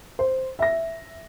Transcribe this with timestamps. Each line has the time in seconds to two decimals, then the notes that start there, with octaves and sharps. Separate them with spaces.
0.19 C5
0.59 E5 A#6